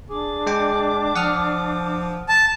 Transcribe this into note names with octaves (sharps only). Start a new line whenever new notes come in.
D4 G#4 D6
G#3 G5
F3 F#5 D#6 F6
A5